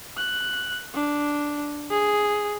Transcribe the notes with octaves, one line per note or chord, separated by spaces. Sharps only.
F#6
D4
G#4